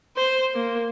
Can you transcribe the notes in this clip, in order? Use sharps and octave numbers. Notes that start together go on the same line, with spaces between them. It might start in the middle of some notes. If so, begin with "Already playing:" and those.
C5
A#3